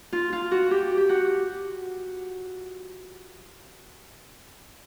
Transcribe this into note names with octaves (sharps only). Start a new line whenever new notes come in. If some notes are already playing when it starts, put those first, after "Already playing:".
F4
F4
F#4
G4
G4
F#4